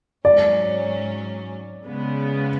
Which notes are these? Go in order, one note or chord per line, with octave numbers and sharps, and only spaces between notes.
G#2 F#3 C#4 D5
C#3 G#3 B3